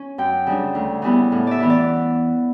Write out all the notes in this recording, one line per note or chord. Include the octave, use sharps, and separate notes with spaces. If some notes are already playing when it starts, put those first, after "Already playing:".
Already playing: C#4
F#2 G5
C#3 G3 D4
D2
C#3 G3 B3 E4
A2
D5 E5
E3 B3 E4
D5